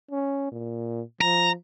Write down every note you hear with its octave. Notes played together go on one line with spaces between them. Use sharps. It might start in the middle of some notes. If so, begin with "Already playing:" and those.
C#4
A#2
F3 A#5